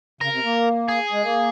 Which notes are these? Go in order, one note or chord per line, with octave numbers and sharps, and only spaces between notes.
C#3 A#4
C3
A#3
G#4
G#3
A#3